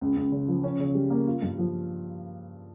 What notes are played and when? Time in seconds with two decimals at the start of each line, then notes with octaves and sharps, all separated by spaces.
0.01 C#2
0.16 C#2
0.32 C#3
0.48 F3
0.63 C#4
0.80 C#3
0.95 G3
1.10 A#3
1.27 F4
1.42 G2
1.58 F3